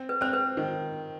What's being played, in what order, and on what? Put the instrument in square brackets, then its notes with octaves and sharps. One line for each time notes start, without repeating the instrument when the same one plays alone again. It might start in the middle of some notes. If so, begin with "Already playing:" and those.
Already playing: [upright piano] C4
[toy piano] B4
[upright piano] C4 [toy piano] C5
[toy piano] B4
[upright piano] D#3